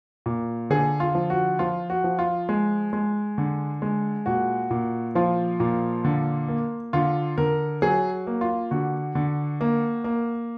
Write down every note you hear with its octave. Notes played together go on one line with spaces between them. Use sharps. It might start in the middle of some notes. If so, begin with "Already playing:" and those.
A#2
D3 G#4
F4
F3
F#4
F3 F4
F#4
F3
F4
G#3
G#3
D3
G#3
A#2 F#4
A#2
F3 F4
A#2
D3
A#3
D3 F4
D3 A#4
F#3 G#4
A#3
F4
D3 F#4
D3
A#3
A#3